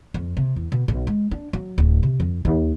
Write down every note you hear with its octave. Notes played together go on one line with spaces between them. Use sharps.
F2
C3
E2
B2
B1
G#3
D4
F#3
D1
C3
F2
D#2